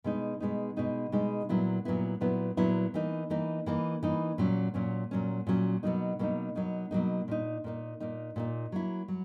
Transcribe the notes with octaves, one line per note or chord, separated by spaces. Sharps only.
B2 G#3 B3 D#4
B2 G#3 B3 D#4
B2 G#3 B3 D#4
B2 G#3 B3 D#4
A#2 F#3 B3 E4
A#2 F#3 B3 E4
A#2 F#3 B3 E4
A#2 F#3 B3 E4
E3 A#3 D#4
E3 A#3 D#4
E3 A#3 D#4
E3 A#3 D#4
A#2 F#3 C#4
A#2 F#3 C#4
A#2 F#3 C#4
A#2 F#3 C#4
B2 F#3 A#3 D#4
B2 F#3 A#3 D#4
B2 F#3 A#3 D#4
B2 F#3 A#3 D#4
A#2 A#3 D#4
A#2 A#3 D#4
A#2 A#3 D#4
A#2 A#3 D#4
F#3 A#3 E4
F#3